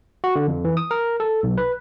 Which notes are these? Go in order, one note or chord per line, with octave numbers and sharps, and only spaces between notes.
F#4
D3
F2
E3
D#6
A#4
A4
B1
B4